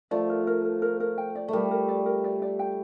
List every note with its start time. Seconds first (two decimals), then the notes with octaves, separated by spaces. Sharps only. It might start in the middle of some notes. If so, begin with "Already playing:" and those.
0.11 F3 A3 D5
0.30 A#4
0.47 A#4
0.65 A#4
0.82 A#4
1.00 A#4
1.18 G5
1.35 D5
1.48 G3 A3 A#4
1.71 A#4
1.88 D5
2.06 A#4
2.24 D5
2.42 D5
2.59 G5